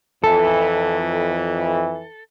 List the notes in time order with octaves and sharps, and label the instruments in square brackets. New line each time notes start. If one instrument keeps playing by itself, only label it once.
[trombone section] F2 E3 [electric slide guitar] A4